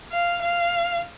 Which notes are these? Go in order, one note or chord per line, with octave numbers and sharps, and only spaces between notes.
F5
F5